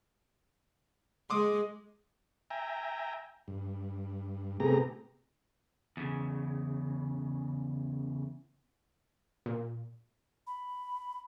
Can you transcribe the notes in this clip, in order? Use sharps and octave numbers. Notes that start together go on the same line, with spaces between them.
G#3 C6 D6 D#6
E5 G5 G#5 A#5
G2
C3 A3 B3 G4 G#4 A#5
E2 C#3
A#2
B5